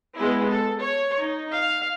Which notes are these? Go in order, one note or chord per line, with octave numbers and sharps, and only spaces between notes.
G#3 B3 E4
A4
C#5
D#4
F5